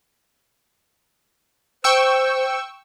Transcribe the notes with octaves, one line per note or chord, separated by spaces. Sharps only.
C5 G5 C#6 E6